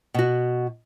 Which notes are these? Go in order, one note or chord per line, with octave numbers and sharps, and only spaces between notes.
B2 F#4